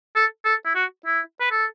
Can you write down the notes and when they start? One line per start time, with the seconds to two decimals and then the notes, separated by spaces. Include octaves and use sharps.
0.16 A4
0.45 A4
0.65 E4
0.75 F#4
1.06 E4
1.40 B4
1.51 A4